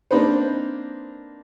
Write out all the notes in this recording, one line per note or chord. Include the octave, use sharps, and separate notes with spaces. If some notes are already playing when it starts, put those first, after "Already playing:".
A#3 C4 D4 D#4 B4 C5